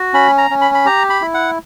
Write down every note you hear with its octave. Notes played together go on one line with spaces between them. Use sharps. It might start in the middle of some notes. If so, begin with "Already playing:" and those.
Already playing: F#4
C#4 B5
A#5
C#4
B5
B5
G4 A#5
B5
E4
F#5